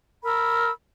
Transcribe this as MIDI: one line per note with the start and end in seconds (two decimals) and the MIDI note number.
0.24 0.70 70
0.24 0.70 83
0.24 0.70 88